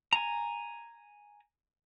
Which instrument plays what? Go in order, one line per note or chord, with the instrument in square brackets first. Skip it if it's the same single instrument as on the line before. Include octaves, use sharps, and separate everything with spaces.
[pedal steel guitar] G#5 A#5